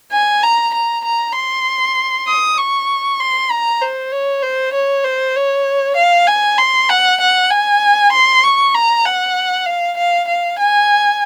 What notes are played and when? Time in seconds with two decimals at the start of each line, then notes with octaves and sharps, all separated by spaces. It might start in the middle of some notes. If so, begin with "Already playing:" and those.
0.12 G#5
0.43 A#5
0.74 A#5
1.05 A#5
1.36 C6
2.28 D#6
2.58 C#6
3.20 C6
3.51 A#5
3.82 C5
4.12 C#5
4.43 C5
4.73 C#5
5.04 C5
5.36 C#5
5.96 F5
6.27 G#5
6.58 C6
6.89 F#5
7.20 F#5
7.50 G#5
8.12 C6
8.43 C#6
8.74 A#5
9.05 F#5
9.66 F5
9.97 F5
10.28 F5
10.59 G#5